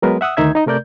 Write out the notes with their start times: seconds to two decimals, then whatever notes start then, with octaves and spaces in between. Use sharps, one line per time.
0.02 F#3 G#3 B3 A#4 B4
0.21 E5 F#5 D#6 E6
0.37 D2 D#3 D#4 E5 G#6
0.55 D#4 D#5
0.66 C3 A3 A#4 D5 G6